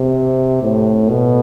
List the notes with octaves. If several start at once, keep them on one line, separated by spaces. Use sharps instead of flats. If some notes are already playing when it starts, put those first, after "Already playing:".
Already playing: C3
A2
B2